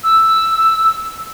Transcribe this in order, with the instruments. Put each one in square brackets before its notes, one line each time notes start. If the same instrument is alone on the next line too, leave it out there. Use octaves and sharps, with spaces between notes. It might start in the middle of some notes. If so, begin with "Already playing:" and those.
[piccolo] E6